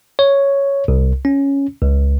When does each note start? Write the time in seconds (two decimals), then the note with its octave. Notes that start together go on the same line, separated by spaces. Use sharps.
0.19 C#5
0.88 C2
1.25 C#4
1.82 C#2